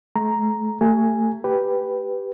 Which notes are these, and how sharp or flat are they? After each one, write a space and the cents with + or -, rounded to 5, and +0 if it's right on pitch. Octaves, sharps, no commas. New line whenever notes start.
A3 -35 A#5 +0
A3 +30 G4 +0 G#5 +0
G4 +0 B4 +0